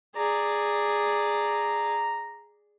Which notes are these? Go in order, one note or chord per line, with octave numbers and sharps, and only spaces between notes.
G#4 D5 A#5